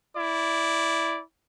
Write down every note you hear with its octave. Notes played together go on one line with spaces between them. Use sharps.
E4 D5